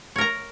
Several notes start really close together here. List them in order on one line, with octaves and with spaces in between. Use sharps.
C#5 A#4 A#5